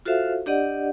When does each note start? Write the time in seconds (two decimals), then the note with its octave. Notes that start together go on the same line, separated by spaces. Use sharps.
0.05 F4 F#4 A4 C5 E5 F5
0.46 D4 G4 D5 D#5 F#5